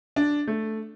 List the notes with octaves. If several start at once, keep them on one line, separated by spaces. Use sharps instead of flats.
D4
A3